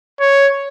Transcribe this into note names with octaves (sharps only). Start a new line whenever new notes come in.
C#5